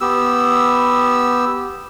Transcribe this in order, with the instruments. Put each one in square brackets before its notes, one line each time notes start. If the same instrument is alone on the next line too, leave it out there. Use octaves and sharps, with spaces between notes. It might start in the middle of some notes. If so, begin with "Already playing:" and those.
[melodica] B3 G4 E6